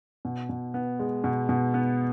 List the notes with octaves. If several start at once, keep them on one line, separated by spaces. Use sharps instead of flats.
B2
B2
B3
G#3
B2
B2
B3